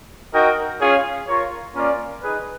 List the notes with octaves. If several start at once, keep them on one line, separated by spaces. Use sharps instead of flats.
D#4 F#4 A#4 D#5 G5
C#4 F4 G#4 C#5 F5
F4 A#4 C#5
A#3 C#4 F4 A#4 D5
D#4 G#4 B4